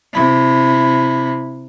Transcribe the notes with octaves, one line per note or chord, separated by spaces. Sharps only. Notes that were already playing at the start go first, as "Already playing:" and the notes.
C3 E4